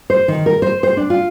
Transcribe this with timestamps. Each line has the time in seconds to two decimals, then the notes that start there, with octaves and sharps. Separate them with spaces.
0.10 C5
0.28 D#3
0.46 A#4
0.62 C5
0.83 C5
0.97 D4
1.10 F4